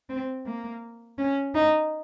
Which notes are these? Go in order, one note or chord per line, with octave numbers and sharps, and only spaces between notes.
C4
A#3
C#4
D#4